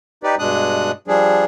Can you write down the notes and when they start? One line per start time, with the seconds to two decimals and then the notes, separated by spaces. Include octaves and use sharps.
0.23 D#4 G4 B4 D5
0.39 G2 B2 G#3 D4 D#6 F#6
1.08 F3 G3 D4 G#4